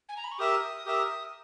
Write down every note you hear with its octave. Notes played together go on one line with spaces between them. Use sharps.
G#5
A#5
B5
C#6
G4 A#4 E5 D#6
G4 A#4 E5